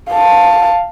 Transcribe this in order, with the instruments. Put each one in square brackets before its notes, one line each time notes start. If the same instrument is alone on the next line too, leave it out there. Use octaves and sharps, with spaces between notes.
[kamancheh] F5 A5